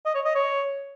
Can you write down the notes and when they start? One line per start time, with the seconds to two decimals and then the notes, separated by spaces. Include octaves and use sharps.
0.06 D#5
0.15 C#5
0.25 D#5
0.35 C#5